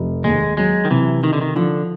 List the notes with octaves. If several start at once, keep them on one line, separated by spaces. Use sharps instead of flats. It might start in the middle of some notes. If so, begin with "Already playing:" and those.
Already playing: F1
D#2 G#3
F#3 G#3
D#3
C3 E3
D#3 D#4
D3
D#3
D3 F3